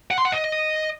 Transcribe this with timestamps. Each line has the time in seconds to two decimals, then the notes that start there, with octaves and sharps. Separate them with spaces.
0.11 F#5
0.18 C6
0.25 F#5
0.32 D#5